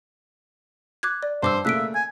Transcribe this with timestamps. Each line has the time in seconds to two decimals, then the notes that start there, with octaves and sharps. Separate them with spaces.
1.03 D6 F#6 G#6
1.23 D5
1.43 G2 C5 A5 D6 E6
1.65 C#3 A3 A#3 E5 F#6 B6 D7
1.95 G#5